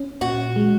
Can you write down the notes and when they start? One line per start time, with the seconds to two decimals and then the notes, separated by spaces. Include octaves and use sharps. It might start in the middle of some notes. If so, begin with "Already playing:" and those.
Already playing: C#4
0.21 A#2 F#4
0.56 G#3